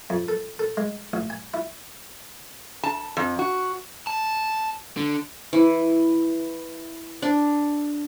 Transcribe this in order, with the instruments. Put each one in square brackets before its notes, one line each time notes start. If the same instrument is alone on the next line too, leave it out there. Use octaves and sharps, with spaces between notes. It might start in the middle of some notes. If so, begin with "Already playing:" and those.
[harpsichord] F2
A4
A4
G#3
A1
G#5
E4
[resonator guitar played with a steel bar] A5
F2
F#4
[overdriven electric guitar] A5
D3
[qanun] E3
D4